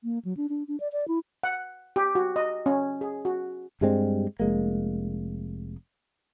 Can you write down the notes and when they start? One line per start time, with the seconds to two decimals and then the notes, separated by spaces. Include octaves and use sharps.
0.04 A#3
0.25 F#3
0.37 D4
0.49 D4
0.68 D4
0.80 D5
0.92 D5
1.08 E4
1.43 F#5
1.96 G4
2.15 F#4
2.36 D#5
2.66 C#4
3.01 G#4
3.25 F#4
3.81 G2 G3 G#3 C4
4.40 F1 G#3 A#3